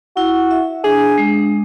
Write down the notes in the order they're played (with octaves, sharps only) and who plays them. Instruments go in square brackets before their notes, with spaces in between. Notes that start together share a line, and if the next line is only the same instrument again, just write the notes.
[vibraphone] E4 [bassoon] F#4
[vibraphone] E5
[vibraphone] D4 [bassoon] G#4
[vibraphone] G#3